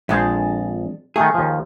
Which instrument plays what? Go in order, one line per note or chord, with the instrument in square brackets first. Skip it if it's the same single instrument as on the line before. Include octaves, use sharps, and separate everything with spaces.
[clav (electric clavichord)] A#1 G#4 C5 [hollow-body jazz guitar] F2 G#3 D4
[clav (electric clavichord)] D#3 A3 [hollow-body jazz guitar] G#4
[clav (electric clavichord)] D#2 F3